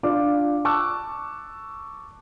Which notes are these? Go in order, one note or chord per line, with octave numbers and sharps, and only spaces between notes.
D4 F4 D6
A5 C#6 D6 E6 F#6